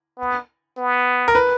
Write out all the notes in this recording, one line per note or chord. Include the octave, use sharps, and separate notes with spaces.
B3
B3
A#4
B4